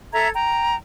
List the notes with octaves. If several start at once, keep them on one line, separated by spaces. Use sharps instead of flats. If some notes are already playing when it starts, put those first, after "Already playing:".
A4 E5 A#5 G#6
G5 A#5